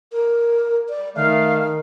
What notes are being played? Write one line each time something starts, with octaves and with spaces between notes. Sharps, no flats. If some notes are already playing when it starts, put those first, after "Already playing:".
A#4
D5
D#3 A3 F5